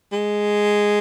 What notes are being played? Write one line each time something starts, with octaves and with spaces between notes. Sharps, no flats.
G#3